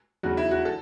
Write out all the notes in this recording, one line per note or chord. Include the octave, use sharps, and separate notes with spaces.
E2 C#3 F#3 F#4
E4
F#4
A4